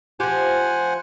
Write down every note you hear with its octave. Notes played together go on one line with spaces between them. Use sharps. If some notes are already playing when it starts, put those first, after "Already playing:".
F3 G4 C5 F#5 G#5